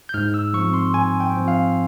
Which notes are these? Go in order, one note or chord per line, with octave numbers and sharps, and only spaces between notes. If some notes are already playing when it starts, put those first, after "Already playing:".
G6
G#2 F6
E6
F3 C4 C#6
C6
G#2 G#5
G5
F3 C4
F5